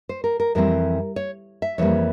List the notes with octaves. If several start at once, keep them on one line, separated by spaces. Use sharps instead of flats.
C5
A#4
A#4
F2 E3 G3 C4 A#4
C#5
E5
F2 E3 G3 A#3 C#5